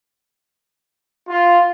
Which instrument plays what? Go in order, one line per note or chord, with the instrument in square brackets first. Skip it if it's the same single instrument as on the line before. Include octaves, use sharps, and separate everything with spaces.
[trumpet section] F4